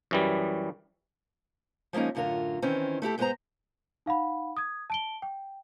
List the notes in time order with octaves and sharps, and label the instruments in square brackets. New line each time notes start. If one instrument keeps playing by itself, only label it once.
[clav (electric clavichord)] F#2 E3 G3
[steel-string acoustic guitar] F3 G#3 A#3 C#4 D#4
F#2 A2 D3 F4 A#4
D#3 E3 C4 C#4
A3 E4 G4 A4
G#2 G#3 B3 B4 C5 A#5
[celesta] D#4 F5 F#5 B5
D#6 G#6
A5 D7 G7
G5